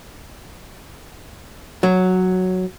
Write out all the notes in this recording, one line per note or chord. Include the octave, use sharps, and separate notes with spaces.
F#3